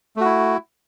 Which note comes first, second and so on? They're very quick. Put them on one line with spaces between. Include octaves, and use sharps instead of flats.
A3 F#4 E4